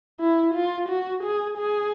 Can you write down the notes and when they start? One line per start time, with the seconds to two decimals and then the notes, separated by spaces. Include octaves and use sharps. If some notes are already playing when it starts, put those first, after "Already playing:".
0.20 E4
0.54 F4
0.89 F#4
1.24 G#4
1.58 G#4